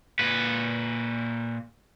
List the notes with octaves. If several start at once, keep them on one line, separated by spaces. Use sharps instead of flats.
A#2 B4